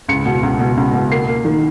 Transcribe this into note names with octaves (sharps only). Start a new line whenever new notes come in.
C#2 C#7
B2
C#2
B2
C#2
B2
A#3 C7
A#3
D#3